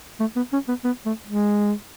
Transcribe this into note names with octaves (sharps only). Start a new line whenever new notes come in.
A3
B3
C#4
B3
B3
A3
G#3